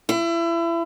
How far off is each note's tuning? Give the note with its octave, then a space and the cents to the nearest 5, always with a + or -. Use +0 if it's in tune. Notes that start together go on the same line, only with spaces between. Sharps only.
E4 +30